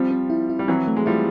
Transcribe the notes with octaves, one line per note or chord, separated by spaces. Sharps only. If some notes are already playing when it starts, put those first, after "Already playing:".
Already playing: F3 G3 C4
C4
E4
E4
G3
E3 F#3 C4
A3
G#3
F3 G3 E4